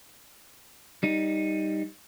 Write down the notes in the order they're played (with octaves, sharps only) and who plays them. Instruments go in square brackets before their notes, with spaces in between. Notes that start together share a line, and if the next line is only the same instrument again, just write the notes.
[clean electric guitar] G3 D#4